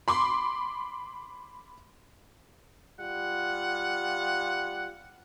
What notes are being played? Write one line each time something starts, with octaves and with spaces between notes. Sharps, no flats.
B5 C6 D6
G3 F4 F#5